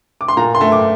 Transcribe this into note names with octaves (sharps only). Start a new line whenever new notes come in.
D6
C6
A#2 A#5
C6
A3
D6